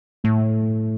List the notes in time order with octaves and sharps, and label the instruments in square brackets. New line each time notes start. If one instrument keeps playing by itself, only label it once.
[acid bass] A2 [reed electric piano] A3